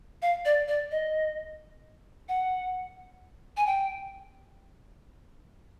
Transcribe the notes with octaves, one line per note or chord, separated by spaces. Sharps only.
F5
D5
D5
D#5
F#5
G#5
G5